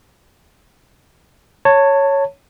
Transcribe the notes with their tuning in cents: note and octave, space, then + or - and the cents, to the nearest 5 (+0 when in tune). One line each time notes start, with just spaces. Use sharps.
C#5 +0 A5 +25